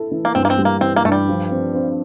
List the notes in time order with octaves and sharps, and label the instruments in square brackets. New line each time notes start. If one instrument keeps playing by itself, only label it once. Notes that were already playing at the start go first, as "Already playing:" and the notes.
Already playing: [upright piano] E4 A4
E3
[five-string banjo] A#3
[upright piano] G2 [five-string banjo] C4
[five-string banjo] A#3
C4
[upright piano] G3
[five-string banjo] A#3
[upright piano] E3 [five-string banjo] C4
[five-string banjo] A#3
[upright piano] G2 [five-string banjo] A3
[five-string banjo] G3
[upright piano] F3
C4
C4